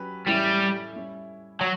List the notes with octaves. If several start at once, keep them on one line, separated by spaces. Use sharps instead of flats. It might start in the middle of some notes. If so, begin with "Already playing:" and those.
Already playing: F#3 C#4 G4 B4
A2 E3 G3 A3 C#4 E4
G3 C#4 E4
F#3 F#4